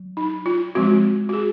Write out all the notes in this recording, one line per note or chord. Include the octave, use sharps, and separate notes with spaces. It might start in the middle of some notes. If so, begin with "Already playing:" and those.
Already playing: F#3
D#4
F4
F3 G#3 C4 F#4
F#4
G#4